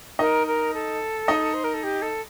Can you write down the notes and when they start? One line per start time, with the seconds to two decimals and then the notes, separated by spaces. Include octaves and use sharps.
0.19 D#4 A#4 D#5
0.47 A#4
0.74 A4
1.28 D#4 D#5
1.54 C5
1.64 A#4
1.74 A4
1.83 G4
2.02 A4